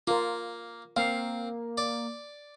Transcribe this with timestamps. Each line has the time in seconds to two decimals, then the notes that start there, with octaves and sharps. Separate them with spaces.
0.07 A#3 F4 A#4
0.96 A#3 C4 F5
1.77 D5